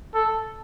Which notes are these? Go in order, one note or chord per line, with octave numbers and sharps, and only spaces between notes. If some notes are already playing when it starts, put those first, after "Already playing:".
A4